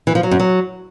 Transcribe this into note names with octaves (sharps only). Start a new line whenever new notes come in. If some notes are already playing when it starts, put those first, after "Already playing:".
E3
F3
F#3
F#2
F#3